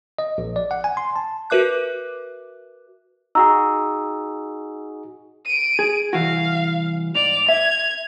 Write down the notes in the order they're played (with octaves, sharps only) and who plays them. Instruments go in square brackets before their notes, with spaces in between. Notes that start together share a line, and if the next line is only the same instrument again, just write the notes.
[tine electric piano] D#5
A#1
D5
F#5
G#5
C6
A5
[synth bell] F#4 A#4 B4 E5 D6 F#6
[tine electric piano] D#4 F#4 G#4 [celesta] A#5 E6
[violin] D7 D#7
[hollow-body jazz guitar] G#4
[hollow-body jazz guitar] C2 E3 F#4 [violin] F5
[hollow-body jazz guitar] G#2 [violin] D5 [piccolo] F7
[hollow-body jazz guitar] E5 [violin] G#6